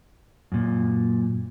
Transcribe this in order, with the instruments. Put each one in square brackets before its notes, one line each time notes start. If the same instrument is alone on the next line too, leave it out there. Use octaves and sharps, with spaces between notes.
[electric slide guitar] F#2 A#2